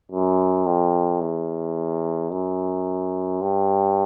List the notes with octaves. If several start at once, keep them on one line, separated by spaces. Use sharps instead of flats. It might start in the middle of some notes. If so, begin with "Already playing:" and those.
F#2
F2
E2
F#2
G2